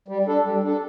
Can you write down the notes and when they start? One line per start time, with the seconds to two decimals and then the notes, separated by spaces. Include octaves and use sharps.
0.08 G3
0.27 D4 A4
0.45 G3
0.63 D4 A4